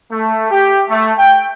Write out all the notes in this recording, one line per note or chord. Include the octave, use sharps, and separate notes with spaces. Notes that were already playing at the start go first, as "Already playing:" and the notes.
A3
G4
A3
G5